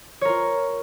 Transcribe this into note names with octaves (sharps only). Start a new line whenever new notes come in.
F4 A#4 C#5